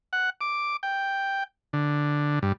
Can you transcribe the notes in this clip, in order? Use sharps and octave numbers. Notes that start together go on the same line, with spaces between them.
F#5
D6
G5
D3
G2